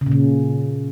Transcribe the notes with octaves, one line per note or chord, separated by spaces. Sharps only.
C#3
A#2
C#3